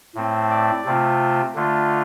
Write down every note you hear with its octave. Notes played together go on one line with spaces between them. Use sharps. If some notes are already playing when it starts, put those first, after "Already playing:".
A2 A3 C4
D5
C3 A3 C4 F4
D3 A3 F4